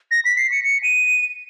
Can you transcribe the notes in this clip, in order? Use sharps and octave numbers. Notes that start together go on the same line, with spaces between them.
A#6
B6
C7
C#7
C#7
D#7